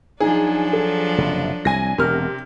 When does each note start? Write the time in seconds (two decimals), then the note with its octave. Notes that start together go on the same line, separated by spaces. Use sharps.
0.20 F3 F#3 D4 D#4 G#4
0.73 A4
1.18 F#1 C3
1.65 C2 G#5 A#6
1.98 E1 C3 A#4 F6